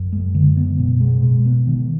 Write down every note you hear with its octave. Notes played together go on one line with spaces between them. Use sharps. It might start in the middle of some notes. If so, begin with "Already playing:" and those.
Already playing: F#2
G#3
D3
B3
B2
G#3
B2
B3
D#3